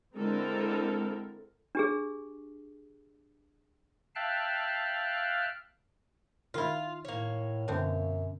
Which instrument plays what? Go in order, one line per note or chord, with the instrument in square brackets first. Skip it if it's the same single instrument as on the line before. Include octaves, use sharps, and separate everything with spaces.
[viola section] D3 G#3 C4 E4 A4 A#4
[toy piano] D4 G4 G#4
[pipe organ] E5 F5 G5 A5 F6 F#6
[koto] D#3 E4 [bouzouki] F4
[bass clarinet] A2 [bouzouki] A#3 C#5
[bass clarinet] F#2 [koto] B2 D3 C4